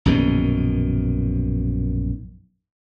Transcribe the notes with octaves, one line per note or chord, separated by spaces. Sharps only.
A#1 F#2 B2 D#3